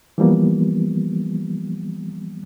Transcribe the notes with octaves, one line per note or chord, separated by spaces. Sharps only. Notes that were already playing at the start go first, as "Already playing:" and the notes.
E3 F3 G3 A#3 B3